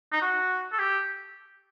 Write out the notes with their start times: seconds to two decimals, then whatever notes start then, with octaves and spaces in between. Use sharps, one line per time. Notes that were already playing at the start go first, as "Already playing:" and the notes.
0.12 D#4
0.21 F#4
0.72 A4
0.78 G4